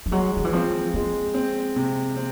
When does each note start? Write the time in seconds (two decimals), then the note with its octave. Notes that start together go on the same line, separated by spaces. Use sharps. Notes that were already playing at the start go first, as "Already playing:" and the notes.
0.06 F3
0.11 F#3 G#3
0.36 D#3
0.45 E3
0.53 F3 C4
0.94 F3 G#3
1.34 C4
1.76 C3
2.16 C4